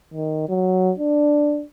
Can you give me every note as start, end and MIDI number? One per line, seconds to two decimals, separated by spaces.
0.14 0.45 51
0.49 0.91 54
0.99 1.64 62